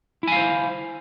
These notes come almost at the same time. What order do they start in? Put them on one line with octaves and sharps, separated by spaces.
E4 G#5 F5 C5